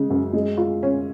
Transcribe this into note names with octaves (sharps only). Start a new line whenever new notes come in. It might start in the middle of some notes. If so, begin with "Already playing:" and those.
Already playing: C#3 G#3
F#2
G#3
F4
C#4